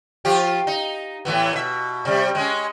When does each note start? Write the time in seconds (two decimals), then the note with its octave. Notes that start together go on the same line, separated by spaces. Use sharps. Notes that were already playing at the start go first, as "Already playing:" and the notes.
0.25 F3 F4 G4
0.67 D#4
1.25 A2 E3 B3
1.53 B2 E5
2.05 C3 G3
2.35 G#3 C#4